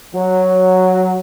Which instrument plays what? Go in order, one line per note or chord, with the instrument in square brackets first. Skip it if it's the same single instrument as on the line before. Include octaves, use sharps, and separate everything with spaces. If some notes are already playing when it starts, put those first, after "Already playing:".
[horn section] F#3